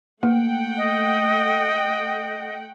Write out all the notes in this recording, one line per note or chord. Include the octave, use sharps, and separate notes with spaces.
A3 A#3 F#5 G5
D#5